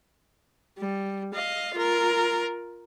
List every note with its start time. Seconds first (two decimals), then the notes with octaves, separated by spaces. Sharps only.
0.78 G3
1.34 D#5 F5
1.74 F4 A#4